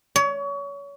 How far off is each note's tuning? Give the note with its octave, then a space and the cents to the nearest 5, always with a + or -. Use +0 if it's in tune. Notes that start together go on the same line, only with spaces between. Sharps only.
C#5 +30